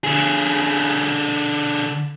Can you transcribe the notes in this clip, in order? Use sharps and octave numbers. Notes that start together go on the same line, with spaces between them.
D3 G#4